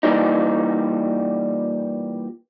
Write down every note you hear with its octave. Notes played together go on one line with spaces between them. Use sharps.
A#2 E3 G3 D#4